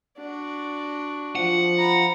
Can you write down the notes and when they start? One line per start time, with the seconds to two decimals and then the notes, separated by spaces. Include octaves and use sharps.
0.18 D4 F#4
1.35 F3 F#5
1.78 A#5 B5